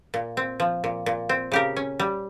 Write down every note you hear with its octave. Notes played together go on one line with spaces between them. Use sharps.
A#2
C4
F3
A#2
A#2
C4
C#3 G4 A#4
C#4
G3